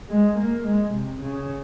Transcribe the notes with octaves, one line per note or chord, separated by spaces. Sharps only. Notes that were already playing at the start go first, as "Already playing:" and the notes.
G#3
A#3
G#3
C3
C#3